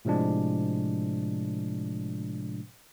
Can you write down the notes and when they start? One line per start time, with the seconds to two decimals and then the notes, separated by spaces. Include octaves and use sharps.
0.05 A2 C3 F3 G#3 D4